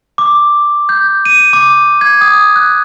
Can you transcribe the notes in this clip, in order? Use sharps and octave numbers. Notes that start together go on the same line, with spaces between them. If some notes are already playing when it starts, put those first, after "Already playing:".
D6
G6
D#7
D6
G#6
D#6
F#6